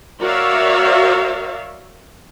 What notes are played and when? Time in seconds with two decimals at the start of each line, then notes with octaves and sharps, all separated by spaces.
0.21 F#4 A#4 C#5 D5 E5 F5